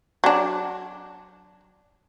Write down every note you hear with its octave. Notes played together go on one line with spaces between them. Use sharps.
F#3 D4